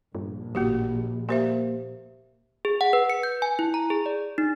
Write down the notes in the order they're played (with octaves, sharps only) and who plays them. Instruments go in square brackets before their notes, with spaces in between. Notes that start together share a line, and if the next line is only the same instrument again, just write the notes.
[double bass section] A#1 [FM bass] G2
[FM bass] A1 [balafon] A#3 F#4 G4
[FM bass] A#3 [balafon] G4 C5 E5
[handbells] G#4
F#5
B4
C#7
G6
G#5
E4
A#5
G#4
D5
D#4